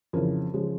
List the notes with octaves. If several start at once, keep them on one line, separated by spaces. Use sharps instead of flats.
F2 C#3 E3 A#4
C#3 F3 G#3